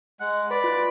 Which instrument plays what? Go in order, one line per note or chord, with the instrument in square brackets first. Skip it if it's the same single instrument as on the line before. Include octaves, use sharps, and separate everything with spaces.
[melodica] G#3 [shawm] F#5
[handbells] B4 [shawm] D5 [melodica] B5
[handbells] F4